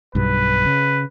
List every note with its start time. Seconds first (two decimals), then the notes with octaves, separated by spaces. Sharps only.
0.15 B1 G2 B4
0.66 C#3